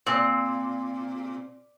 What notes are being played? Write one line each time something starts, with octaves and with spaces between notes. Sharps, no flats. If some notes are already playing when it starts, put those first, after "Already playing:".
A#2 C4